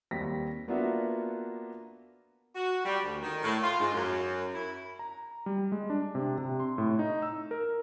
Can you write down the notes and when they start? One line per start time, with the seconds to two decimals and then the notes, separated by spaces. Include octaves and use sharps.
0.11 D#2 G3 C4 A#6 B6
0.68 A#3 B3 D4 F4 F#4 E5
2.55 F#4
2.85 G3
3.04 D2
3.22 D#3
3.43 A2
3.63 F4
3.79 G#2
3.93 F#2
4.54 E4
4.99 A#5
5.46 G3
5.72 G#3
5.90 D4
6.15 C3
6.38 C3
6.60 C6
6.78 A2
6.99 D#4
7.22 E6
7.51 A#4